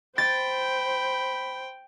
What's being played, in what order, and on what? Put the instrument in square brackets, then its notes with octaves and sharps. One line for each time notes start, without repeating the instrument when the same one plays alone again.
[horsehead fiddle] C5 [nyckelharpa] G5 [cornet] B5 [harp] A6